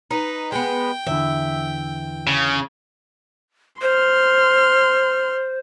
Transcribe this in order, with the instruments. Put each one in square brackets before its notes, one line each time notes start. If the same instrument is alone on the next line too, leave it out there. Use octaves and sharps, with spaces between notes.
[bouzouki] D#4 [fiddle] B4
[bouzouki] G#3 B3 [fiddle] G5
[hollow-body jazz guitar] E2 D3 E3 [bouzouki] E5
[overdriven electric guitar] C#3
[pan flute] C5 [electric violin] C6 F6